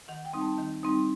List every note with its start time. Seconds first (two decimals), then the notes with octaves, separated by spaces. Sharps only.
0.08 D#3 F#5
0.25 G5
0.33 G3 C4 D#4
0.41 A5
0.58 D#3
0.83 G3 C4 D#4